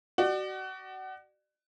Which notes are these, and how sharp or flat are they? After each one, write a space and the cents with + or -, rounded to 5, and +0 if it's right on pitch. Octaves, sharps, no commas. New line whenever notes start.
F#4 +30 D5 +35